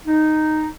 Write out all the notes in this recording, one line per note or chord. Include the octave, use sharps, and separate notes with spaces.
D#4